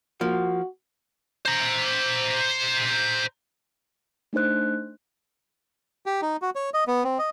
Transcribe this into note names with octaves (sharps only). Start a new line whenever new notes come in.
F3 A#3 F#4
C5 A#5
A3 D4 D#4 C5 F#6
G4
D#4
F#4
C#5
D#5
B3
C4
D#5